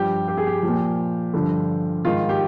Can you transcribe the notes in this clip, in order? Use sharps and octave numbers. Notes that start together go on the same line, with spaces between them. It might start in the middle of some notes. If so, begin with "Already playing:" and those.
Already playing: G2 F3 G4
G4
G#4
G4
A#2 F3
G2 D3 F3
G#2 D#3 F4
G4